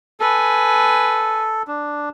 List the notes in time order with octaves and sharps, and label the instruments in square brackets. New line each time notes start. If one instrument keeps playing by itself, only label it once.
[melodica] A4 [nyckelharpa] B4 G#5
[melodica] D4